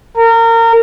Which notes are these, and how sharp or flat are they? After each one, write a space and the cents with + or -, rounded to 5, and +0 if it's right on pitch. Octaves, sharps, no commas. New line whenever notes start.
A#4 -30